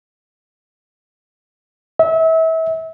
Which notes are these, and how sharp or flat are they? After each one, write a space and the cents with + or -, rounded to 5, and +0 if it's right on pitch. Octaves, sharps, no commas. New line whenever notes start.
E5 -30